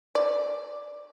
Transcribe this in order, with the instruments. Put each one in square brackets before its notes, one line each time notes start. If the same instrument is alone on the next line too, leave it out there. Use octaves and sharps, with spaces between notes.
[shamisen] D5